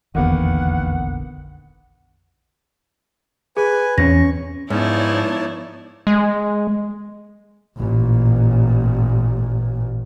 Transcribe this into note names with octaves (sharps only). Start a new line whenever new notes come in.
F1 A#1 E2 D3 D#3 A#3 B3 F#5
G#4 B4 G#5
E2 C4 C#4 C#6 A#6
G#2 F3 B3 D#4 E4 C#5 D5 A5
G#3
A1 A#2